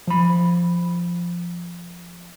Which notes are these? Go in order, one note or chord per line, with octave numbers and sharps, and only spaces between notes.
F3 B5